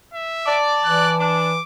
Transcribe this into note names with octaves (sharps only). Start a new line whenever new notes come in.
E5
D5 A5
E3 F#6
D4 D6